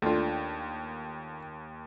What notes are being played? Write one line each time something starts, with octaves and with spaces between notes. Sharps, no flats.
D#2 A3 D4 F4 G5